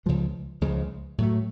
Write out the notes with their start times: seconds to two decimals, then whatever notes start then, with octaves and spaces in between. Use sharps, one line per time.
0.06 C#2 C#3 F3 G#3
0.61 C#2 C#3 F3 G#3
1.18 A2 F#3 A3